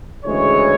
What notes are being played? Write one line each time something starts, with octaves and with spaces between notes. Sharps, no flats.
D2 C#3 E3 G#3 C#5